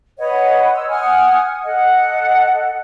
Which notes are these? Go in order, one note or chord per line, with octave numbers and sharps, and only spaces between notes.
B4 C#5 D#5 F#5
C6 E6
F#5 G#5 D#6 F6
A4 D#5 F#5